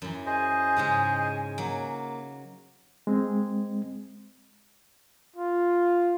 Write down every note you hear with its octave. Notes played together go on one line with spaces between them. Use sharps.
F#2 E3
G#4 C5 D#5 G#5
G#2 C#3 G#3
F#3 A#3
G#3 C4
F4